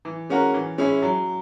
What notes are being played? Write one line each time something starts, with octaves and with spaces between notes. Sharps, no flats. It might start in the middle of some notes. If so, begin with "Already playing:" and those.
E3
G#3 C#4 F#4 A#4
E3
G#3 C#4 E4 G#4
F#3